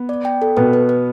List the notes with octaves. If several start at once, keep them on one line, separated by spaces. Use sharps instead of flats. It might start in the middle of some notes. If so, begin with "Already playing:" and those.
Already playing: B3
D5
G5
A4
B2 B3 B4
B4
B4